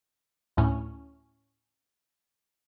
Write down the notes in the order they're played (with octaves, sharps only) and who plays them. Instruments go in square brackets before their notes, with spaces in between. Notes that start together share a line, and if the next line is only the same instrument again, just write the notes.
[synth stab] D2 A2 C#4